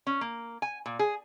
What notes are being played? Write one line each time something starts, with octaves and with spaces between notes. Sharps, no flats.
C#4
A#3
G#5
A#2
G#4